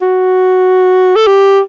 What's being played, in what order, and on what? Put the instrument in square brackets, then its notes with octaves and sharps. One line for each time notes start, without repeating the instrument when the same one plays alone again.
[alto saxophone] F#4
A4
G4